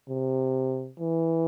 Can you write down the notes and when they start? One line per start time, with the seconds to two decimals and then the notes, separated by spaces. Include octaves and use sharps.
0.09 C3
1.00 E3